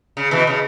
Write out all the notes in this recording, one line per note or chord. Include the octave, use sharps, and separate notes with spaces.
C#3
B2 E3
C#3